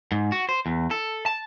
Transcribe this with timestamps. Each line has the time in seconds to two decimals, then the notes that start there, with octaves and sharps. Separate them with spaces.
0.12 G#2
0.32 F#4
0.49 C5
0.66 E2
0.91 A4
1.26 A5